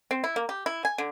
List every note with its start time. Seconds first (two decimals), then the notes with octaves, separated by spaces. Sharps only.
0.11 C4
0.24 E4
0.36 A#3
0.49 G4
0.66 E4
0.85 G#5
0.98 D3